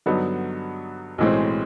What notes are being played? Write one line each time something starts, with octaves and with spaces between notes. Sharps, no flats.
G2 D3 F#3 B3 D#4
B1 A2 E3 G#3 C4